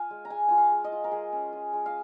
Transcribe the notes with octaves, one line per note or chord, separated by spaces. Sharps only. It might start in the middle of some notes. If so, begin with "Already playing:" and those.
Already playing: F4 F5 G#5
G#3
A#5
G#3 G#5
F4 G#5
F5
G#3
D#5
F4
A#4
G#3 G#4
C#4
F4
G#3
F5